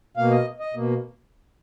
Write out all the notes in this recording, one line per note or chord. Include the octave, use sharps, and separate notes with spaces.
B2 A#3 F5
D#5
D#5
B2 A#3